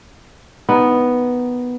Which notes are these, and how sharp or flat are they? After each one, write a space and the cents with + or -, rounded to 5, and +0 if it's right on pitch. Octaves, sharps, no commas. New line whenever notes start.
D#3 +0 B3 +0